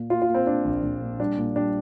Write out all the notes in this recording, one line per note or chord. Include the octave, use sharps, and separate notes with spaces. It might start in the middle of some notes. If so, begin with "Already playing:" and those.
Already playing: A#2 A#3
A#3 F4
F4
A#3
C4
A#3 D4
A#1
A#1
A#2
G3 D4
A#2
G3 D4